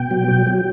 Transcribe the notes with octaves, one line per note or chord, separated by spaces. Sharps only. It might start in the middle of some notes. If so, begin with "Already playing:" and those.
Already playing: B2 G5
F#3
F#3
F#3